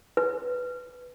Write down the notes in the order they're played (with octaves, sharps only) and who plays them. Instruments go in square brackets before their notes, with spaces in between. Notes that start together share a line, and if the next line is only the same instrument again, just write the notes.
[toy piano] B4